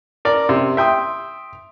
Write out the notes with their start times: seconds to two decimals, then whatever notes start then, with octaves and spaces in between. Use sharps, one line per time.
0.25 A#4 D5
0.49 C3
0.77 E5 G5 C6 D#6